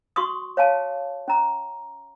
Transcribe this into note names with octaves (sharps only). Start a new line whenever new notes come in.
F#4 C6 C#6 D#6
C#5 F5 G#5 A5
C#4 A#5